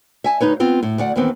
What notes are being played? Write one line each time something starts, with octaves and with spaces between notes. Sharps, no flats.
E5 G#5 A5
D2 D#4 B4 C#5
B3 C4 F4
A2
D2 D5 F#5
D#2 D#3 E3 B3 C4